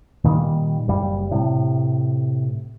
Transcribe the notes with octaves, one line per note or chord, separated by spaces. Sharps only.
A#2 D#3 F#3 G3
F#1 G3
A2 C3